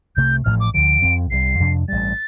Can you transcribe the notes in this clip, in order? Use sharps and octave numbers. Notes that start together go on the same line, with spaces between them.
C2 C3 A3 G6
A1 A2 F3 A3 F6
D6
D2 D3 F3 D7
F2 F3 C4
C2 C3 G3 C7
F2 C3 F3 D4
A1 G2 G3 A6